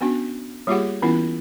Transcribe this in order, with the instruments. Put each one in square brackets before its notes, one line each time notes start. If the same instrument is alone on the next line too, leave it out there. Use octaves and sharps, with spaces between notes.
[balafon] B3 C#4 D4 F#4
G3 A#3 F4 G4 G#4 F#5
E3 B3 C#4 E4 F4